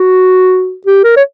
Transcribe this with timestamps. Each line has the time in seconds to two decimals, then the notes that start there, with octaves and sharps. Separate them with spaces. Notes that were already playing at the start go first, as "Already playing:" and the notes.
Already playing: F#4
0.86 G4
1.04 A#4
1.16 C#5